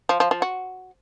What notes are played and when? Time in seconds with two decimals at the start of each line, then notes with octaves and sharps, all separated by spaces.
0.09 F3
0.20 F3
0.31 F3
0.42 F#4